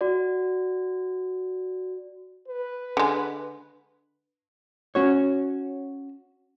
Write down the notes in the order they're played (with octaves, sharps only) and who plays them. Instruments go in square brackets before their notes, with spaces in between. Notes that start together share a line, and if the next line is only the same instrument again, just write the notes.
[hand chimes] F#4 D5
[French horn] B4
[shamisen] D3 G#3
[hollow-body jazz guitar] C#4 F#4 C#5